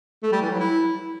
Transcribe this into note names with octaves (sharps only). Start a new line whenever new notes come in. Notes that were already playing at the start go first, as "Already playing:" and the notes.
A3
G3
E3
F#3
E4